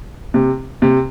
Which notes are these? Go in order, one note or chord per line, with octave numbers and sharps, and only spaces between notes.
C3
C3